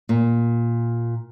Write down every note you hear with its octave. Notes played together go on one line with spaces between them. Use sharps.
A#2